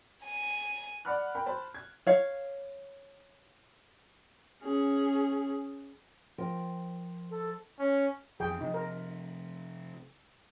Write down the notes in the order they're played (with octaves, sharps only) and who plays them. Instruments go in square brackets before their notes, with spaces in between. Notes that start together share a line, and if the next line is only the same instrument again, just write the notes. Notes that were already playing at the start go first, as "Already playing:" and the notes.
[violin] G#5
[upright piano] D5 F#5 B5 F6 F#6
A#4 G5 B5
C5 A5 B5
G#6
[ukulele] C#5 F5
[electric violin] C#4 G#4
[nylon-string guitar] F3 A#4 G5
[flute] A4
[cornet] C#4
[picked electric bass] F2 E3 [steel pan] G#4 G5
[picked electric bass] C3 F3 [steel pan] D#4
[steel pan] A#4